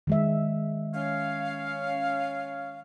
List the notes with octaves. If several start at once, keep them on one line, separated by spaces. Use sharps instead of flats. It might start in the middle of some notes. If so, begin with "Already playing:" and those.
D#3 G#3 E5
C#4 C#5 F5